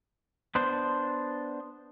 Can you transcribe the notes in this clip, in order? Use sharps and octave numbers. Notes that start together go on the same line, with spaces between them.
B3 D4 C5